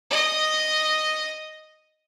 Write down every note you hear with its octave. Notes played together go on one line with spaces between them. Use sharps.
D#5 D#6